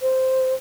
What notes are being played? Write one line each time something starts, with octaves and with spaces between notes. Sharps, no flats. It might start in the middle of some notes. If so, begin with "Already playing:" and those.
C5